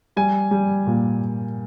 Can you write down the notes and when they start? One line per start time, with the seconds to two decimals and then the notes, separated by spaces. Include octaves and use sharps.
0.16 G3 G#5
0.51 G3
0.87 A#2